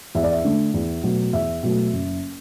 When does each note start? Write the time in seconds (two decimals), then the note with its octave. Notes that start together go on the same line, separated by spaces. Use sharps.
0.15 E2 E5
0.24 D5
0.32 E5
0.44 D3 A3
0.74 E2
1.03 B2 F#3 A3
1.33 E2 E5
1.63 B2 F#3 A3
1.93 F#1